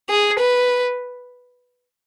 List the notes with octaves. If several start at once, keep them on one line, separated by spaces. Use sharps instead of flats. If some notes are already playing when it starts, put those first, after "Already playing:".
G#4
B4